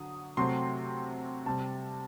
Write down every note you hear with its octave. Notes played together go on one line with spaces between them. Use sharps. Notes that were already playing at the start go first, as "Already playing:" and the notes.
Already playing: D3 F#3 D#6
C3 F#3 A3 C4 C6
C3 G3 C4 A5